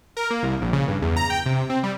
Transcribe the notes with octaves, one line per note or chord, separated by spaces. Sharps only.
A#4
A#3
C2
A#1
C#3
G2
E2
A#5
G5
C3
C4
G3